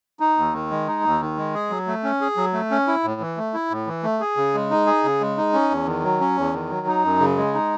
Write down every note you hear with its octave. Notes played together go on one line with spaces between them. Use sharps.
D#4
D#2
D#3
G#3
D#4
D#2
D#3
G#3
G#4
F#3
A3
C#4
G#4
F#3
A3
C#4
E4
A2
E3
A3
E4
A2
E3
A3
G#4
C#3
G#3
D#4
G#4
C#3
G#3
D#4
C#4
E2
D#3
F#3
C#4
E2
D#3
F#3
D#4
F#2
C#3
G#3
D#4